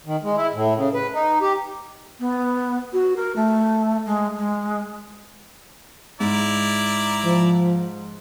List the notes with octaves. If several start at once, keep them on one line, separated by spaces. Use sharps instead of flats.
D#3
G#3
E4
A2
C#3
B4
D#4
G4
B3
F#4
A#4
A3
G#3
G#3
G#2 E4 D5 A#5
F3